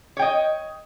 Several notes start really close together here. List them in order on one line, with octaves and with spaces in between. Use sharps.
C#5 G5 D#5